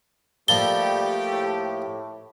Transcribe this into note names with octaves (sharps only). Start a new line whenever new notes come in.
F3 G3 A3 A#3 G4 A4 G7
A2